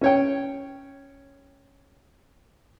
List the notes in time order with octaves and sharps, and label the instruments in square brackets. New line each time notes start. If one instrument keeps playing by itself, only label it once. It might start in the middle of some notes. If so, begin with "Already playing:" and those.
[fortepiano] C#4 C#5 G5